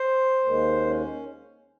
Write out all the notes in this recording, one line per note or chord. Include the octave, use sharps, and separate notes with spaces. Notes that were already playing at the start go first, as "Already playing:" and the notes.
Already playing: C5
D#2 D#3 G#3
C#4